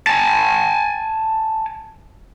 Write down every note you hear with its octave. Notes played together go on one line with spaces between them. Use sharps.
G#5 A5